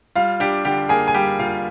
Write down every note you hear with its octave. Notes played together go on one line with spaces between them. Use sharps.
G3 F4 F5
D4 G4 G5
D3 G4 G5
A#3 G#4 G#5
G#5
G3 G4 G5
A#3 F4 F5